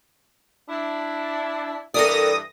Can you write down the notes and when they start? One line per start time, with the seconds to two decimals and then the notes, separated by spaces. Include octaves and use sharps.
0.69 D4 E4
1.94 G2 E3 A4 A#4 D5 D#6 A#6